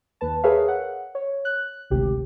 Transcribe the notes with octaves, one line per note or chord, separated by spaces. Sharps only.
D#2 B4 A5
G#4 A#4 B4 C#5 E5 F5
F#5
C#5
F#6
G#1 D2 C3 G4